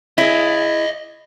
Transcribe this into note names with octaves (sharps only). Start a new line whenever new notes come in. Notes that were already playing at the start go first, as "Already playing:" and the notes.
E4 G#4 C#5 D#5